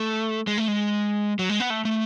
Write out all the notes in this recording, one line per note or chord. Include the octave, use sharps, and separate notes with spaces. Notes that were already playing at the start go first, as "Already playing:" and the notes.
Already playing: A3
G#3
A3
G#3
F#3
G#3
B3
A3
A3